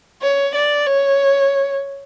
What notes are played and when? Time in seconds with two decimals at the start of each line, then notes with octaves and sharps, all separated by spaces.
0.22 C#5
0.55 D5
0.87 C#5